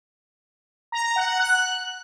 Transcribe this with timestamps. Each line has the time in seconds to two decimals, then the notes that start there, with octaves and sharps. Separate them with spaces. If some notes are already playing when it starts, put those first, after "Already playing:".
0.92 A#5
1.04 A#5
1.16 F#5
1.28 F#5
1.40 F#6